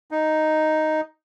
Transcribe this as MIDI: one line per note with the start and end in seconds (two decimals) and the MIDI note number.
0.11 1.01 63